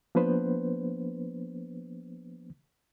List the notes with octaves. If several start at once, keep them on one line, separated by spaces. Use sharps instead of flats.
F3 A#3 B3 D4 B4 C5